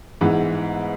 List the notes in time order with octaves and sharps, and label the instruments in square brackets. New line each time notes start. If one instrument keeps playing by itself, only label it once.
[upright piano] G#2 E3 B3